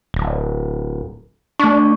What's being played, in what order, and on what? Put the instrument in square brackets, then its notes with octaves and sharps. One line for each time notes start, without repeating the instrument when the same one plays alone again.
[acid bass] D1
[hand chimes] A3 C#6 [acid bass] D4